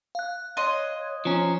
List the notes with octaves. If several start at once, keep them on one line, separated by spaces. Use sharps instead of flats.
F5 F#6
C#5 D#5 C6
F3 C#4 A#5